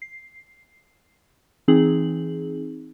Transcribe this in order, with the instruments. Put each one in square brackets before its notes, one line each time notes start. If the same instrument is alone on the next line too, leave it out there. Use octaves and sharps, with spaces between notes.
[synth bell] C7
E3 C4 D#4 G#4 F#7